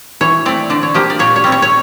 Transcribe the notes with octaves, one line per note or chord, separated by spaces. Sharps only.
E3 C#5
A3 C4 D5
D3 D5
C#5
F3 A#3 G4
D5
A#2 C#5
C#5
G3 C4
C#5
C#5